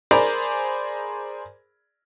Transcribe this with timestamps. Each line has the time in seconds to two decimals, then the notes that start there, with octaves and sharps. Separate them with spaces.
0.11 G#4 A#4 C5 D5 A#5 B5